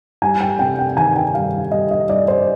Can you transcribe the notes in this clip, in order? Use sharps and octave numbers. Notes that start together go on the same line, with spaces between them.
G3 G#5
G5
C3 G5
G5
D#3 G#5
G5
G3 F5
G3 D#5
D#5
G3 D5
C5